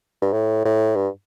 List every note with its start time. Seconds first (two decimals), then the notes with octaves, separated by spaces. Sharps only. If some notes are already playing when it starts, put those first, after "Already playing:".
0.22 G2
0.33 A2
0.65 A2
0.96 G2